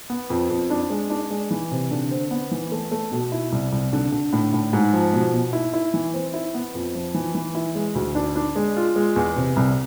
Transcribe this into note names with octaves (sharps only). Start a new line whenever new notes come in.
B3
F2
F2
D4
G#3
D4
G#3
E3
C3
D3
C4
B3
E3
A3
A3
B2
E4
C2
C2
D3
D3
A2
A2
G#2
F3
B2
B2
E4
E4
E3
C4
E4
B3
F2
F3
E3
E3
E4
G#3
D2
D4
D4
G#3
F4
G#3
E2
C3
C2